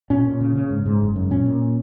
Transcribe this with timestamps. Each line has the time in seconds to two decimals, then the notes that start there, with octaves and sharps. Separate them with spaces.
0.10 A#2 C#4
0.25 A#2
0.41 C#3
0.55 C#3
0.70 G#2
0.86 G#2
1.01 F#1
1.16 F#2
1.31 A#2 C#4
1.46 A#2